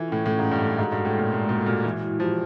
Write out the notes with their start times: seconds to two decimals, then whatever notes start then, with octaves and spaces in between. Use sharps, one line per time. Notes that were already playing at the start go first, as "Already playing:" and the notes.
Already playing: E3 F4 A4
0.08 A2 C#4
0.25 A2 C#4
0.39 G#2
0.43 C#4
0.52 G2
0.60 A4
0.66 A2
0.78 G#2 F#4
0.92 G2 G#3
1.05 A2
1.14 A#2 G#3
1.32 A#2 G#3
1.49 A#2 G#3
1.66 A#2 F#4
1.84 E3 E4
2.02 E4
2.20 F3 G4